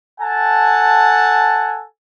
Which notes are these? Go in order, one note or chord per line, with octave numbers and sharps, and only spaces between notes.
A4 F#5 G#5 A5